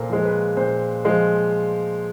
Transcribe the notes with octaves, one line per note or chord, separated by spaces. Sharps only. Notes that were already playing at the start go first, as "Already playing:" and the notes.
Already playing: A#2 A4 A#4 C5
F3 G#3
B4
A#2 C5
F3 G#3